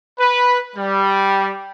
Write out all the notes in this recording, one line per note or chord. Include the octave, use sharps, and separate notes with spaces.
B4
G3